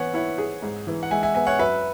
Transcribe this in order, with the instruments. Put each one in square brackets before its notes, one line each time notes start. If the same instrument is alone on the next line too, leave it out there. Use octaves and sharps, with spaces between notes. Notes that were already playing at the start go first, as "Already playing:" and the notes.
Already playing: [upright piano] E3 B3 [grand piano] C#5 F#5 G#5
[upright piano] E4 [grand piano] C#5 F#5
[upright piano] G#4
G#2
E3
[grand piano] F#5
[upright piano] G#3 [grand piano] E5 G#5
[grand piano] E5 G#5
[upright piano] B3 [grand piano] E5 G#5
[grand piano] C#5 F#5
[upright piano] F#2 [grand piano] B4 E5